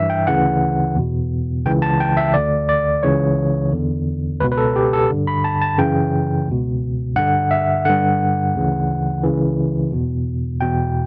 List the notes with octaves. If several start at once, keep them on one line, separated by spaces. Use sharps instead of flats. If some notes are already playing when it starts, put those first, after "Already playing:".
Already playing: G2 E3 E5
G5
D2 C#3 E3 F#5
E2 B2
C#2 C#3 E3 G5
A5
G5
E5
D2 D3 D5
D5
C#2 C#3 E3 C#5
E2 D3
C#2 B2 B4
B4
A4
G4
A4
G2 D3
B5
A5
A5
F#2 C#3 E3 G5
C#2 B2
G2 D3 F#5
E5
G2 D3 F#5
D2 C#3 E3
C#2 C#3 E3
E2 B2
E2 B2 G5